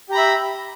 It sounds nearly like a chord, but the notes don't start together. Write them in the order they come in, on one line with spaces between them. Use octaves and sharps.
G4 A#5 B5 E5